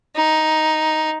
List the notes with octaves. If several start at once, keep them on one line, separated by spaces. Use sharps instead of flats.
D#4